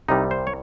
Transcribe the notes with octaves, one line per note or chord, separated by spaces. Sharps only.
C2 C3 G3 D#4
C5
C#5